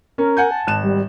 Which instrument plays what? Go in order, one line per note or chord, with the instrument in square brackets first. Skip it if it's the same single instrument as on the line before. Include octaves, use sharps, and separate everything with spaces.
[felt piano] C#4 [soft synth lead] A#4
[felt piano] F#5 G#5 G6
[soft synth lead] A5
[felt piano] G#1 F#6 E7
[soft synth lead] G3